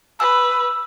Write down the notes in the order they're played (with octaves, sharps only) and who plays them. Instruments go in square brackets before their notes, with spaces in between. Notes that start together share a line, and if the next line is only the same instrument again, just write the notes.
[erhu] B4 [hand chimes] E6